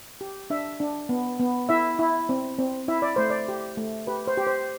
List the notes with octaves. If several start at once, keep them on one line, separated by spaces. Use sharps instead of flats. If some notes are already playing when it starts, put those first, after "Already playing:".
G4
D4 E5
D4
B3
B3
E4 E5
E4
C4
C4
E4 E5
D5
A3 C5
D5
G4
A3
G4 B4
C5
G4
C5